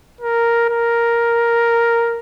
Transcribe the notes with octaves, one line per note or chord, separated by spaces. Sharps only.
A#4
A#4